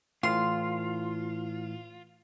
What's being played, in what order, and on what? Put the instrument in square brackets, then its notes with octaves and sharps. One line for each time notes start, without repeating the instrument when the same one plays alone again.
[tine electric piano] A2 E3 F6 [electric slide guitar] F4 [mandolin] C6